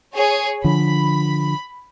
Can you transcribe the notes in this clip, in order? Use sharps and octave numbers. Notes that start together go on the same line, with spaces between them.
G#4 C#5
D3 F3 B5